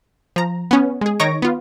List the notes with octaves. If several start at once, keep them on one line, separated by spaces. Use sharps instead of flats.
F3 A#5
B3 C#4
G#3 G#4
D#3 D#4 C#5 C#6 A#6 D7
B3 F4